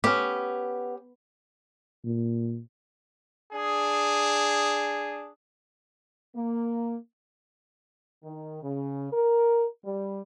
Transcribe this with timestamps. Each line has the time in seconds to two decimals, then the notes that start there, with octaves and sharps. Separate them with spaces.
0.04 B3 C#4 G4
2.04 A#2
3.52 D4 G#4
6.36 A#3
8.24 D#3
8.63 C#3
9.12 A#4
9.85 G3